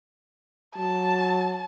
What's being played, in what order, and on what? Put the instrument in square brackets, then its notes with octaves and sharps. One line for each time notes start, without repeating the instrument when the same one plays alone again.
[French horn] F#3 [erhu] A5